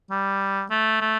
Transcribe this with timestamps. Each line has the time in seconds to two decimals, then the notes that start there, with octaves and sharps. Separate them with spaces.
0.11 G3
0.70 A3
1.01 A3